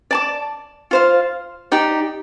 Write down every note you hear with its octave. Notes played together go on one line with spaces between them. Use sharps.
D5 A5 D6
F4 C5 F5
D#4 G4 D5 G5